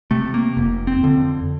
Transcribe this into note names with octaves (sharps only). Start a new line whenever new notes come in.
C3 A3
A#3
F1
C4
F2 D3